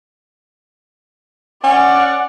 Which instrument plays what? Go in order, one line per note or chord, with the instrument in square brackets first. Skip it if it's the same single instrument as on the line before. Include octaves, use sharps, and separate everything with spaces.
[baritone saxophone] C#4 [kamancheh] D5 F#5